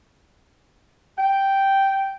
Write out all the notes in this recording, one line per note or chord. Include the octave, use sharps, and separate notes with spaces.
G5